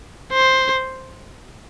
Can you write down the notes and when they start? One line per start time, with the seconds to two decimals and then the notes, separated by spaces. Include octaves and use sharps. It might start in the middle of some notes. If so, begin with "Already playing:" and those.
0.33 C5